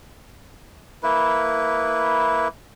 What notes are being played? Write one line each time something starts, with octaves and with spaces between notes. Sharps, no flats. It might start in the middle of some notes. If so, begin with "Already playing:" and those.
A#3 E4 B4